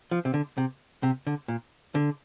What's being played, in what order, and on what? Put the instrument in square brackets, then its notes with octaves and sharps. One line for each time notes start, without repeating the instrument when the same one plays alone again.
[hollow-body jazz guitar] F3
C3
D3
C3
C3
D3
A#2
D3